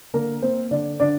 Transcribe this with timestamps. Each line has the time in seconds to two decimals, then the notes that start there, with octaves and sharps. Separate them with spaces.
0.14 D3 A#3 A#4
0.42 A#3 C4 C5
0.71 D3 D4 D5
1.00 D3 D4 D5